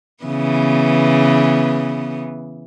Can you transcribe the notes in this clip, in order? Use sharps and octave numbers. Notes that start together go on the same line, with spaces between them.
C#3 E3 B3